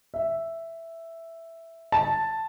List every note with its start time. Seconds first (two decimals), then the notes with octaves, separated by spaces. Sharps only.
0.14 E5
1.92 A5